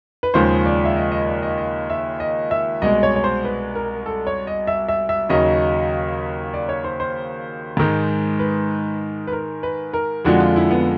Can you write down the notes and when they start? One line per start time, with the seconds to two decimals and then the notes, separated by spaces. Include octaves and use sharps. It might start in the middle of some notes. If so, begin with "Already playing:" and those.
0.23 B4
0.34 D#2 C#3 F3 G#3 C5
0.66 D5
0.85 E5
0.97 D#5
1.11 D#5
1.27 D5
1.42 D#5
1.58 D#5
1.90 E5
2.20 D#5
2.51 E5
2.82 C2 B2 G#3 D#5
3.03 C#5
3.16 C#5
3.24 C5
3.44 B4
3.75 A#4
4.06 A4
4.27 C#5
4.47 D#5
4.67 E5
4.88 E5
5.09 E5
5.29 D#2 C#3 F#3 D#5
6.54 D5
6.69 C#5
6.84 C5
7.00 C5
7.77 G#2 D#3 G#3
8.39 B4
9.27 B4
9.32 A#4
9.63 B4
9.94 A#4
10.25 F2 D3 F3 G#3 F#4
10.40 F4
10.56 E4
10.71 B3